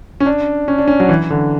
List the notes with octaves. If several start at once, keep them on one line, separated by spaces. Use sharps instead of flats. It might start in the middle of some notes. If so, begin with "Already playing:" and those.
C#4
D4
C#4
D4
C#4
F#3
E3
D3